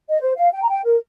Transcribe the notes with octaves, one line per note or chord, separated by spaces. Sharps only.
D#5
C5
F5
G5
A#5
G5
A#4